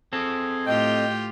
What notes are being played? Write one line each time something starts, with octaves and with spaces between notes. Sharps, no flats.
C4 G#4 A4
A2 F4 G4 D#5 G5